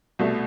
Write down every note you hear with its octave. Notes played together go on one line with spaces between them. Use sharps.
C2 B2 A3